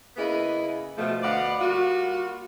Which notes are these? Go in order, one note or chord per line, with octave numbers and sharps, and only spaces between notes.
C#3 A#3 B3 E4 G#4 D#5
B2 F3 A3
D2 B4 D5 D#5 F5 F#5
G3 A#3 F4 F#4